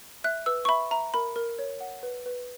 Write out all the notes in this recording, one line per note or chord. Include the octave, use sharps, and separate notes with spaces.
E5 F#6
B4 E6
C#6
E5 B5
E5 A#5
A#4 B5
A#4
C#5
F#5
B4
B4